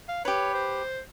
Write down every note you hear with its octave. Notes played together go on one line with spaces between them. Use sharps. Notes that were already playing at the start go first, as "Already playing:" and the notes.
F5
G4 B4 C#5
C5